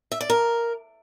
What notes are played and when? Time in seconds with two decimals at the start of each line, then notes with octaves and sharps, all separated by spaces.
0.12 E5
0.21 D5
0.30 A#4